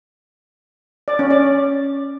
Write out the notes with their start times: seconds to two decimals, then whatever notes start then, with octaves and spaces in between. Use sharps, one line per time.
1.08 D5
1.19 C#4
1.31 D5